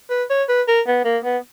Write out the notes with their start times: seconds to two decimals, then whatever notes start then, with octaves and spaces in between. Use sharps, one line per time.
0.10 B4
0.30 C#5
0.49 B4
0.68 A#4
0.87 B3
1.05 A#3
1.24 B3